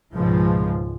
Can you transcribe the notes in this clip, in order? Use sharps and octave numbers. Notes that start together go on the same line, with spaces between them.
C#2 G#2 B2 F3 G#3